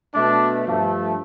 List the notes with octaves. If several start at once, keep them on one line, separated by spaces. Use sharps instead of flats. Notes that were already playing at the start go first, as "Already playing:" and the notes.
B2 A3 D4
G2 F3 A3